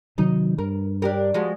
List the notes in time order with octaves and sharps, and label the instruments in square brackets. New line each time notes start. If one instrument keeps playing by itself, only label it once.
[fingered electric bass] C3 D#3 F#3 [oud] D#4
[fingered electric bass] G2 [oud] A#4
[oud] D4 G4 A#4
F3 G#3 F#4